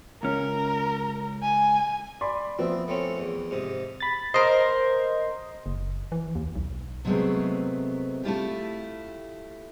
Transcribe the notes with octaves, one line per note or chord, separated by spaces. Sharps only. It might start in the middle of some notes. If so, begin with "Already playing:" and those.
C#2 C#4 A#4
G#5
D5 B5 C6
F3 B3 C4 E5
A3 C4 C#4
E2
G#2 C3 D#6
B5 A6
A#4 C5 D#5 C6
F#1
E3
D#2
B1
C3 F#3 G#3 A3 B3 C4
A3 E4 F4 G4